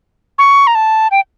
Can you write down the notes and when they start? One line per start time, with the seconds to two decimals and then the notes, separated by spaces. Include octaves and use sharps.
0.38 C#6
0.67 A#5
0.75 A5
1.11 G5